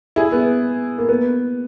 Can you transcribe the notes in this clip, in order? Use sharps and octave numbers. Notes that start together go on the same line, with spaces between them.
E4 G#4
B3
A#3
B3